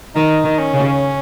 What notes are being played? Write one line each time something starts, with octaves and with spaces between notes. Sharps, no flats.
D#3 D#4
D#3
C#4
C#3